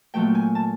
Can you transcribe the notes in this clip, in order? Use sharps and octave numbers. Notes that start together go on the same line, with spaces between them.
A#2 F#3 A3 G5
G#5
A5